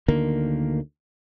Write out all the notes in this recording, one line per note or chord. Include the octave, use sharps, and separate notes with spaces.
D2 D3 D#3 A#3